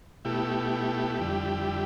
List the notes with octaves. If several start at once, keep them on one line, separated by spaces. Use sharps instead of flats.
B2 A3 E4 G4
F2 D3 G3